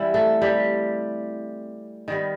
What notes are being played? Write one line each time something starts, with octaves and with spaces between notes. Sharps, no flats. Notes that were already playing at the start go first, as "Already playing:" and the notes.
Already playing: E3 G3 C4 E4
A3 A4
G3 G4
D#3 G3 B3